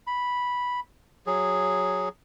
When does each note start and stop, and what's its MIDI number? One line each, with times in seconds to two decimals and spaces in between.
0.07 0.80 83
1.26 2.09 54
1.26 2.09 68